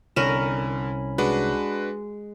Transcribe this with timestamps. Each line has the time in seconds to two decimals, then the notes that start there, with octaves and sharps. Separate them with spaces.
0.16 C2 D3 C#4 A#4 C#5 B5 D#7 E7
1.18 G#3 D4 F#4 B4